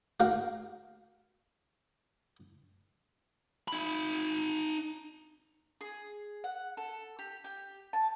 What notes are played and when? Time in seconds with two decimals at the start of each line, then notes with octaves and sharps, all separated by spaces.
0.20 A#3 F#4 A#4 F5 G5
3.68 D#4 B5
5.81 G#4
6.44 F#5
6.77 A4
7.19 G4
7.44 G4
7.93 A5